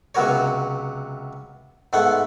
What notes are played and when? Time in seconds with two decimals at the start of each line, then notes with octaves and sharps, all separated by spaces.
0.15 C#2 C3 F#3 B3 A#4 C#5
1.93 G#2 A3 B3 F#5